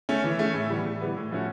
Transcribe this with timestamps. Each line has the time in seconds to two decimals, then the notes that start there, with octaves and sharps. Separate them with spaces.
0.09 A3 C#4
0.24 E3
0.39 A3 C#4
0.54 A2
0.70 E3 G3 B3
0.85 A2
1.01 E3 G3 B3
1.17 A2
1.31 F3 A3 C#4 F#4